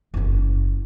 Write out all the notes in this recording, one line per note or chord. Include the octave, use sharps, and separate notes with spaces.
F#1 C#4